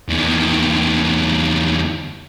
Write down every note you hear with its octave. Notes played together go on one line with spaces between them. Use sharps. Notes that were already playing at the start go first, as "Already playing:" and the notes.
E2 D#3